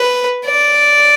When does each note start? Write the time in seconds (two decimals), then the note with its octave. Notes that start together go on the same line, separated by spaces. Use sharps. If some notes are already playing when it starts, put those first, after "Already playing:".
Already playing: B4
0.46 D5